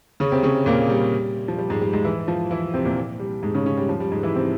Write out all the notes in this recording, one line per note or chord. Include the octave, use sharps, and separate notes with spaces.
C#3 C#4
C3 C4
C#3 C#4
A#2 A#3
G3
F3
G3
G#2 G#3
G3
G#2 G#3
E3 E4
F3 F4
E3 E4
C3 C4
A#2 A#3
G3
G#2 G#3
C#3 C#4
C#3 C#4
G3
F3
G3
G#2 G#3
E3 E4
C3 C4